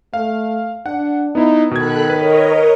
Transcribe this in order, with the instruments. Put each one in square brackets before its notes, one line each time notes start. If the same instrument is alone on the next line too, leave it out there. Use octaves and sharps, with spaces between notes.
[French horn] A3 [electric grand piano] F5
[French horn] D4 [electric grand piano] F#5
[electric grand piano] B3 E4 [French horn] D#4
[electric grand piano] B2 G#6 [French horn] D#3 [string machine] A4 B5 F#6
[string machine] A#4 C#5 D#5 [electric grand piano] B4